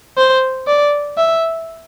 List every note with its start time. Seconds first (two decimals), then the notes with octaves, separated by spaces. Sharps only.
0.18 C5
0.67 D5
1.18 E5